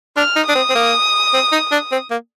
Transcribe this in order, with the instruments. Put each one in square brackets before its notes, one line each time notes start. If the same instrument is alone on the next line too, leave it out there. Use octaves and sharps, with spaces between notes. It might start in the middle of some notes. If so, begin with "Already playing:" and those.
[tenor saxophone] D4 [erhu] F6
[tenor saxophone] D#4
[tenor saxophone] D4 [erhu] D#6
[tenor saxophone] C4
C4
A#3
C4
D#4
D4
C4
A#3